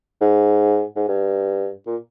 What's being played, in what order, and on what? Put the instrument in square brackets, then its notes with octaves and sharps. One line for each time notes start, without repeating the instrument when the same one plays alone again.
[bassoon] G#2
G#2
G2
A#2